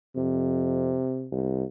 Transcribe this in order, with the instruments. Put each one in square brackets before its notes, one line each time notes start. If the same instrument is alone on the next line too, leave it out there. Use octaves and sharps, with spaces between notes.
[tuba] F2 [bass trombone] C3
[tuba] C2